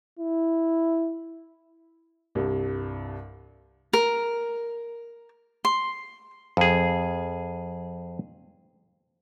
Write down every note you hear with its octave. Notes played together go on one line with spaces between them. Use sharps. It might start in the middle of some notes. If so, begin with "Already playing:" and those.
E4
C2 G2
A#4
C6
F2 G#4